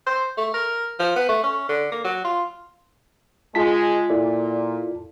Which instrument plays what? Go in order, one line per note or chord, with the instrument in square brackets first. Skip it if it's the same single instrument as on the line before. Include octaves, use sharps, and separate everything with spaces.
[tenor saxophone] C5
A3
A#4
F3
B3
A3
C#4
D3
A#3
F#3
F4
[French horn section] G#3 [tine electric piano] F4 A5 B6
[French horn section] A#2 [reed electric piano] E4 A4 D5